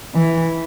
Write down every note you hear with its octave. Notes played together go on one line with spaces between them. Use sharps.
E3